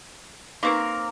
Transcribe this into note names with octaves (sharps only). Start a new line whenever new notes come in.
A#3 C4 D#4 A#4 B4 C#6